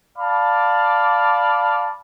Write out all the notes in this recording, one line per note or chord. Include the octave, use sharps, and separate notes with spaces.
D5 F5 A5 B5